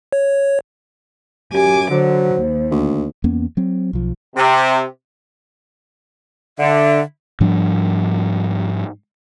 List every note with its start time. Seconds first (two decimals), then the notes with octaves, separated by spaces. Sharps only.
0.13 C#5
1.53 F#2 G4 G#5 D6
1.91 D3 F#3 C5
2.36 D#2
2.71 D2
3.24 E2 A#3 B3 C#4
3.57 F#3 C4
3.93 B1 F3
4.36 C3
6.59 D3 E5
7.40 G#2 F3 G3 D4